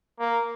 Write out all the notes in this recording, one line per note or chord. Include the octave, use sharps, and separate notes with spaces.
A#3